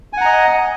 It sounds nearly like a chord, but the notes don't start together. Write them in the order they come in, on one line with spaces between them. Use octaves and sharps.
G#5 F#5 A#5 D#5